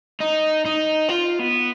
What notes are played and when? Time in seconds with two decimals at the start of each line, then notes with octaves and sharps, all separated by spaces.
0.21 D#4
0.65 D#4
1.09 F4
1.39 B3